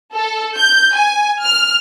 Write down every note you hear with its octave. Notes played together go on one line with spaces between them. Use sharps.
A4
G6
G#5
F6